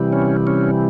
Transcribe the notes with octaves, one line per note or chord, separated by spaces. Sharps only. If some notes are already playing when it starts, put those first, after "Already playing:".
Already playing: C3 E3 G3
C#4
C#4